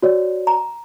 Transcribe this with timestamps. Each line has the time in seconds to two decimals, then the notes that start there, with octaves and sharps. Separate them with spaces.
0.03 F#4 C#5 D5
0.47 A#5